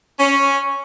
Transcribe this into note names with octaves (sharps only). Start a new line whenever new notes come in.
C#4